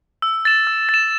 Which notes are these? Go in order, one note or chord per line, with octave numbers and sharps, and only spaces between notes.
E6
A6 E7
E6
A6 E7